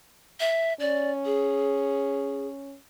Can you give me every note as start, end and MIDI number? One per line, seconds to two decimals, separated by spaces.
0.40 0.74 76
0.80 2.75 61
0.80 1.11 74
1.25 2.47 68